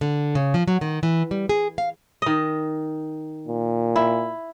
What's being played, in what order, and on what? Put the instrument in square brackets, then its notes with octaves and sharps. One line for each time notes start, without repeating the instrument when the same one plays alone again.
[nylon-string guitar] D3
C#3
F3
F#3
D#3
E3
G3
G#4
F5
[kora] D#3 D#5
[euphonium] A#2
[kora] E4